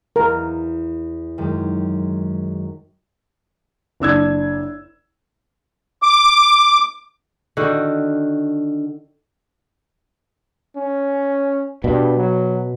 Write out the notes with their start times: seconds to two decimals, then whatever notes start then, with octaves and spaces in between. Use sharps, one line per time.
0.16 E2 A#4
1.38 F#2 D#3 G#3
4.00 F#1 D4 E6 G#6
6.02 D6
7.57 D3 D#3 F#4
10.76 C#4
11.84 G2 B2
12.17 F#3